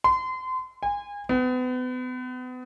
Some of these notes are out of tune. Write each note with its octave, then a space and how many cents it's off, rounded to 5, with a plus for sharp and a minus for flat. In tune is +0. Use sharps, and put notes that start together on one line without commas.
C6 -30
G#5 -30
B3 +35